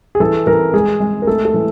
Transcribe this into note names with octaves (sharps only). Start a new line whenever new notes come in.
G#4
E3 A4
E3 A#4
G#3 G#4
G#3
A#4
A3 A4
A4
E3